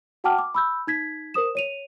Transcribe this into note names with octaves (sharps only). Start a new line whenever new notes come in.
F#4 F#5 G5 A5 D6 F6
D6
B5 E6 G6
D#4 G#6 B6
A#4 C5 D#6 E7
C#5 D#7 F7